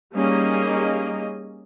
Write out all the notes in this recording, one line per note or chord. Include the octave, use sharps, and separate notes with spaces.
G3 A#3 C#4 D#4 G#4 D#5